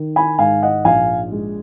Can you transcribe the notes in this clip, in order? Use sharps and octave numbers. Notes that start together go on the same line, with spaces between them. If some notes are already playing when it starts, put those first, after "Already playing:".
Already playing: D#3
G#5 B5
G#2 F5 G#5
D#5 F#5
A#1 F5 G#5
G#3